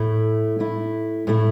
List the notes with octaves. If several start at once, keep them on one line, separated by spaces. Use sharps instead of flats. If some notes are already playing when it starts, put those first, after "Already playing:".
Already playing: A2 A3 E4
A2 A3 E4
A2 A3 E4